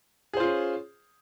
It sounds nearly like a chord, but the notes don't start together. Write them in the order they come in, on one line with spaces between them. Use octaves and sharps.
G#4 C5 F4 C#4